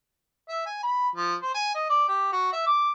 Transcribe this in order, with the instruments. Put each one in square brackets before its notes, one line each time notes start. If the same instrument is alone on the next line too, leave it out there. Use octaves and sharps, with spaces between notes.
[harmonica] E5
G#5
B5
F3
C5
G#5
D#5
D5
G4
F#4
E5
D6